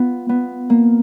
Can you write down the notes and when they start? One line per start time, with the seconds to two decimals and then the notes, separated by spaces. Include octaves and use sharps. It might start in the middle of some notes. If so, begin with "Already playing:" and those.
Already playing: B3 F4
0.29 B3
0.70 A#3